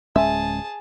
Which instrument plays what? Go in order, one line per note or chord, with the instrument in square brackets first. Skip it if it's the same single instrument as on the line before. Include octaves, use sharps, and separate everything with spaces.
[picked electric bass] D1 G#3 C#4 [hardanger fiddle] G#4 A5 [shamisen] E5